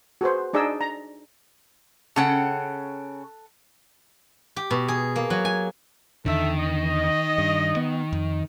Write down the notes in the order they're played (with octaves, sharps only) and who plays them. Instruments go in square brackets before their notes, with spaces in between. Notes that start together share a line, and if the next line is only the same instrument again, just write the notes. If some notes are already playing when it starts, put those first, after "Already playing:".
[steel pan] F#4 G#4 B4 C5
D4 D#4 G#4 D5 D#5 E6
A#5
[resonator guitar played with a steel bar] C#3 C#4 G5 [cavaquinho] A4 F#5
[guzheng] G4
B2
G#4
A#3
F#3
G#5
[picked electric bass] E2 D3 [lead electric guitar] D#3 [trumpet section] A4 E5
[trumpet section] D#5
[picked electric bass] G2
B3
F2